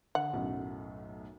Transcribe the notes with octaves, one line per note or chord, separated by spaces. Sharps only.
D3 F#5
B1 F#2 A2